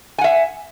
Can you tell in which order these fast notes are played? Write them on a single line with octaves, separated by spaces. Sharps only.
G#5 F#5 E5